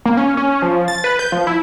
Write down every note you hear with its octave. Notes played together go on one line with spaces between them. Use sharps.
A#3
C#4
C#4
F3
A6
B4
G6
F3
E4